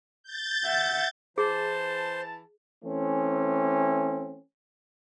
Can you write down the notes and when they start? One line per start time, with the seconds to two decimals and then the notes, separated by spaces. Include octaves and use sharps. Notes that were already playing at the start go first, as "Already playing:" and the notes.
0.23 G6 A6
0.64 E5 F#5
1.38 E3 G#4 C5 A5
2.84 E3 A3 C4 C#4